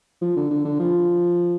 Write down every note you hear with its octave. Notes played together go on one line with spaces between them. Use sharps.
F3
D3
D3
D3
F3